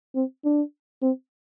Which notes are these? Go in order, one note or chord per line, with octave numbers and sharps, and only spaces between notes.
C4
D4
C4